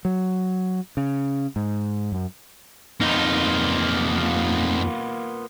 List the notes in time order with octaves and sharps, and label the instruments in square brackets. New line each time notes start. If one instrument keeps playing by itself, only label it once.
[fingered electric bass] F#3
C#3
G#2
F#2
[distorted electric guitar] F2 D#4 [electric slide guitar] A#3 B3 F4